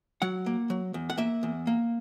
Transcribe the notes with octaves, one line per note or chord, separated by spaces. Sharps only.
F#3 F#5
A#3
F#3
E2
F#5
A#3 E5
E2
A#3